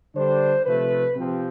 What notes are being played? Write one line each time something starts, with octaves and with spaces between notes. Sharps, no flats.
D3 G3 D4 C5
C3 F3 A3 B4
C3 F3 C4 G4